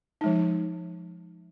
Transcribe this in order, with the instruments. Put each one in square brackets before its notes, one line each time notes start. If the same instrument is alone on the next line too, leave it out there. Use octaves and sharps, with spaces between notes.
[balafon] F3 G#3 D#4